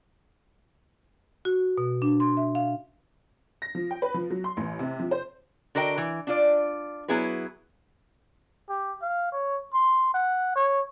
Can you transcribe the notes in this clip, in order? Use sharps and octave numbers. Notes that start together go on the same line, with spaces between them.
F#4
B2
D4
C6
E5
F5
A#6
F3
G5
B4
F3
F#3
C6
A1
C3
F3
C5
D3 F#4 A#4 D#5 G5
E3
D4 F4 D5
F#3 B3 E4 G#4 B4
G4
F5
C#5
C6
F#5
C#5